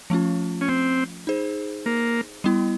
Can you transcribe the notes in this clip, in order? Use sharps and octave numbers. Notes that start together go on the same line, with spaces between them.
F3 A3 C#4 F4
C#4
C4
D#4 G#4 C5
A#3
G3 B3 E4